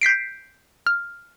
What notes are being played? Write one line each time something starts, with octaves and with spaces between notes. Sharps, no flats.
G6 B6 C7 D7
F6